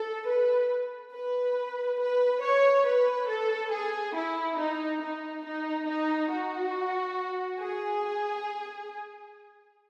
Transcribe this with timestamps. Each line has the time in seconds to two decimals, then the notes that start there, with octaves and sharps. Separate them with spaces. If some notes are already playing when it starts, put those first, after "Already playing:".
Already playing: A4
0.26 B4
1.12 B4
1.99 B4
2.42 C#5
2.86 B4
3.28 A4
3.71 G#4
4.15 E4
4.57 D#4
5.01 D#4
5.44 D#4
5.87 D#4
6.31 F#4
7.60 G#4